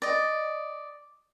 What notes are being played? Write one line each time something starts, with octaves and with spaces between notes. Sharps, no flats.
D5 D#5